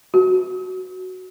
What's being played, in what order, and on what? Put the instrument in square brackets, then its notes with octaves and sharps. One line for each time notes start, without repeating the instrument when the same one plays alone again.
[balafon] F#4